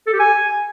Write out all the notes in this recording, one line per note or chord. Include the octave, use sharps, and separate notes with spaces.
A4
G4
G#5